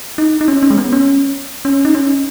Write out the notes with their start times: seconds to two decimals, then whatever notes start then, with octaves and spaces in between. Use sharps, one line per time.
0.18 D#4
0.41 D#4
0.48 C#4
0.63 C#4
0.70 G#3
0.78 B3
0.93 C#4
1.65 C#4
1.85 D#4
1.95 C#4